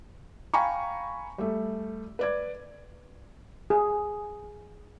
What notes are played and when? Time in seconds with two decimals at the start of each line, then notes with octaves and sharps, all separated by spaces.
0.54 F5 G5 G#5 A#5 B5 C#6
1.38 G3 A3
2.19 B4 D5 G#6
3.70 G#4